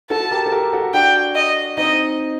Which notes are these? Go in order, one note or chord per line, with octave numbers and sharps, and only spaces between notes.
F#4 A4 A5
G4 A#4
A4
G4 A#4
F#4 A4
D4 F#4 G5
D#5
C4 D#4 D#5